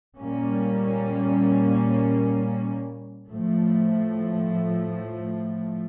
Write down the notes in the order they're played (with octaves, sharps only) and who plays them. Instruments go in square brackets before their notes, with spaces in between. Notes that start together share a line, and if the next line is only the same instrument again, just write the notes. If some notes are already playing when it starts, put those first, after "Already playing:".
[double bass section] A#2 G3 A#3 C#4
A2 F3 A3